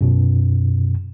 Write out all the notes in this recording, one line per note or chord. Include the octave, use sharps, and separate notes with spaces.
F#2 B2